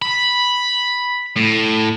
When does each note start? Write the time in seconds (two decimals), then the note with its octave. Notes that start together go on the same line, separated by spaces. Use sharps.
0.02 B5
1.36 A2